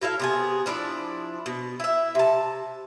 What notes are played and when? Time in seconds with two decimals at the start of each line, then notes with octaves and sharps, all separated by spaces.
0.02 F#3 E4 A4 F5
0.20 C3 B3 G#4
0.66 F3 D4 E4 D5
1.46 B2
1.80 E4 E5
2.15 C3 A5